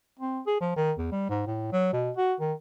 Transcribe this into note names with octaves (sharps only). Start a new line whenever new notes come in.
C4
G#4
F3
D#3
E2
G3
G#2
A2
F#3
B2
F#4
D#3